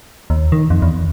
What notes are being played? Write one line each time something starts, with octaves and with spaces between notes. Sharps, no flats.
D#2
D#3
F2
E2